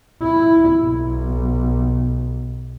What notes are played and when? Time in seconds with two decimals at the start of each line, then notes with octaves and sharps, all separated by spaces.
0.23 E4
0.83 B1